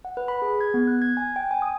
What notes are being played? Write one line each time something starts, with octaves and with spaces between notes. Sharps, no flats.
F#5
B4
B5
G#4
G#6
B3
F#6
G#6
G#5
G5
G#5
D#6